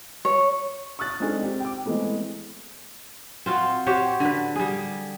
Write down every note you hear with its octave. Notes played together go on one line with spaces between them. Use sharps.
C#5
C#6 D#6 F6 F#6 A6
G#3 C4 D4 D#4 G#4 A4
C4 G4
G5 D6
E3 G#3 A3 B3 C4
C4 F4 F#4
F#4 G4 C5 C#5
D3 B4
G3 G#4